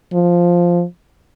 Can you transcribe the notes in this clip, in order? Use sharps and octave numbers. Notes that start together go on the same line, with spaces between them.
F3